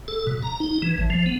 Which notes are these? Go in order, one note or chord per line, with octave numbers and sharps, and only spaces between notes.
A4
B2
A#5
D#4
E3
A1
F3
B3